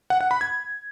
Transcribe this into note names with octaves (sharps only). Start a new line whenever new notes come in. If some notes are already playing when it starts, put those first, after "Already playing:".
F#5
F#5
B5
G#6